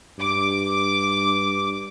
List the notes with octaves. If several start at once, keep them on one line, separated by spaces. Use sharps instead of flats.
G2 D6